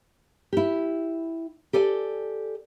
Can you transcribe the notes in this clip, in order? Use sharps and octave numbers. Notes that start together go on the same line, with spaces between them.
E4 G4
G4 A4 D5 G#5